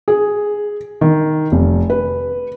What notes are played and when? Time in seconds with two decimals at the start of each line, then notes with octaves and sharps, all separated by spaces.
0.08 G#4
1.01 D#3
1.52 F1
1.90 B4